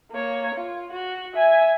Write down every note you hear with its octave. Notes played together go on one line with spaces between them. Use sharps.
A#3 C#5
F4
F#4
E5 G#5